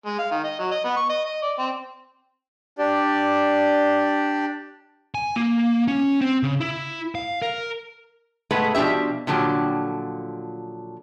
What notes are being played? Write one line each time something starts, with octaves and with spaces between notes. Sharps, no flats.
G#3
F5
D#3
D#5
F#3
D#5
B3
C#6
D#5
D#5
D5
C4
D4 G4 D5
G#5
A#3
C#4
C4
C#3
E4
F5
A#4
A2 G#3 A3 B3 B4
B2 F3 D4 G4 E5
A#2 D3 F3 F#3 G4